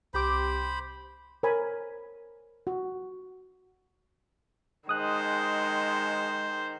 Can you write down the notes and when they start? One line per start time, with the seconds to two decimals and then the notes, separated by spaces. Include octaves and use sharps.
0.14 C2 G4 C5 B5 D6
1.43 A#4 C5 C#5 G#5 B5
2.67 F#4
4.89 D#3 G#3 C5 D#6 F#6